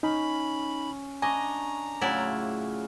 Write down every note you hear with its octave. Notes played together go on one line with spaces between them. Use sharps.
C#4 D#4 B5
D4 D#5 G#5 A#5 C#6
A2 C#3 F#3 E4 F4 D5